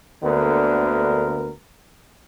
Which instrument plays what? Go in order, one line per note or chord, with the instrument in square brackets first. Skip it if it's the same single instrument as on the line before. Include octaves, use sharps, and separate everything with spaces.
[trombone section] D2 D3 A#3 B3 A#4